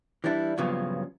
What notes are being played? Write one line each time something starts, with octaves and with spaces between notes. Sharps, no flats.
E3 G3 D4 E4
G2 A#2 C#3 F3 F#3 B3